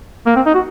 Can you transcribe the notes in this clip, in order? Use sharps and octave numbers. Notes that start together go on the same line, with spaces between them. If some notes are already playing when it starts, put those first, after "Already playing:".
A#3
C4
D#4
F#4